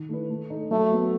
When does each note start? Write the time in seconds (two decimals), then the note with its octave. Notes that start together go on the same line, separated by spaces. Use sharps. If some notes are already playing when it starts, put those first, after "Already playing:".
Already playing: D#3
0.09 A3 E4 B4
0.30 A3
0.50 D#4 A4
0.71 F#3 A3
0.91 B3 F#4 B4